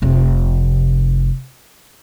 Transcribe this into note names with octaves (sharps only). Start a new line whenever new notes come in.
F1 C3